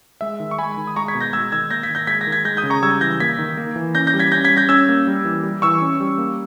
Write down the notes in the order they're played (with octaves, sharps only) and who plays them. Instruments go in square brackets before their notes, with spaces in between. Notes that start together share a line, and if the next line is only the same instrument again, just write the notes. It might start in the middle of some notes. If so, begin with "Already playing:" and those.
[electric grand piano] G#3 E5
D#3
C#6
G#3 G#5 B5
D#3
D#6
G#3 A#5 C#6
G#6 B6
B2
G6 A#6
G#3 E6 G#6
D#3 E6 G#6
A#3 G6 A#6
G#6 B6
D#3
G6 A#6
G#3 G#6 B6
G6 A#6
D#3
G#6 B6
G#3 G6 A#6
D#6 G6
C#3
A#5 C#6
G3 E6 G#6
E3 G6 A#6
A#3 G#6 B6
D#3
A#3
E3
C#4 G6 A#6
G6 A#6
G3
G#6 B6
C#4 G6 A#6
G#6 B6
G3
G6 A#6
C#4 E6 G#6
A#3
G3
E3
G3
E3 C#6 E6
C#4
G3
A#3